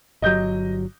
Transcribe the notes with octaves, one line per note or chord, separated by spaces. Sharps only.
G1 F#3 D#5 G6